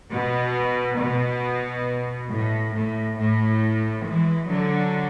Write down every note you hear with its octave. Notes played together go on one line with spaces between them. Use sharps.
B2
B2
A2
A2
A2
E3 G#3
D3 F#3